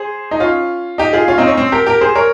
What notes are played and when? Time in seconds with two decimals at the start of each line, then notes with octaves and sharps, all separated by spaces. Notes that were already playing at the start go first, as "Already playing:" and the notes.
Already playing: G#4 C5
0.31 D#4
0.40 C#4 F4
0.98 D#4 G4
1.13 F4 G#4
1.28 C#4 F4
1.38 C4 D#4
1.47 C#4
1.57 C4
1.72 G4 A#4
1.86 G4 A#4
2.01 G#4 C5
2.15 A#4 C#5